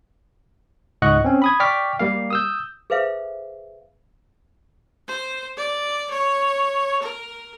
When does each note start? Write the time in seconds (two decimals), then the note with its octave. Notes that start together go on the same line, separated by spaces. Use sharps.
1.02 C#2 G#2 D#5 F#5 C#6 F#6
1.24 C4 C#4
1.42 B5 D#6 G#6
1.60 D5 G5 C#6 D6 F6 B6
1.99 G3 A#3 F5
2.30 D#6 E6 G6
2.90 G#4 A4 B4 C5 E5 F5
5.08 C5
5.57 D5
6.10 C#5
7.02 A#4